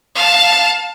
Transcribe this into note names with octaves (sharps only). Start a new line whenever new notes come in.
F5 A5